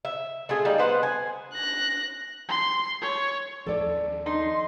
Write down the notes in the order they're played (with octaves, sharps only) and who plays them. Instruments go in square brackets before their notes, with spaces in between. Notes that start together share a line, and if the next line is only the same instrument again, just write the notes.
[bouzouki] E5
A3 F4 G#4
G3 A#3 D#4
B3 B4 C5 F#5
G#5
[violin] F#6 A#6
[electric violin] C6
C#5
[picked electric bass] D#2 F3 [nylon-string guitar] A4 D5
[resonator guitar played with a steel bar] D#4 [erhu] C6